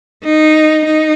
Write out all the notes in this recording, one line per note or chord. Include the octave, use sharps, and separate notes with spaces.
D#4
D#4